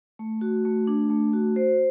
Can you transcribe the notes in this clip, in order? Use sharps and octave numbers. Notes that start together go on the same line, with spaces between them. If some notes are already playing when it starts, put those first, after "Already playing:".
A3
F#4
A3
D4
A3
F#4
C5